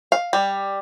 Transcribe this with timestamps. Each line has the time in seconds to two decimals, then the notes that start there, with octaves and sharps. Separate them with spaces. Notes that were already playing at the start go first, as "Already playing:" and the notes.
0.12 F5
0.33 G3